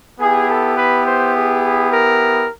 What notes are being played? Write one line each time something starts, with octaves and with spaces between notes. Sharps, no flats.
B3 E4 G4 G#4
A4
B4
C5
G#4
A#4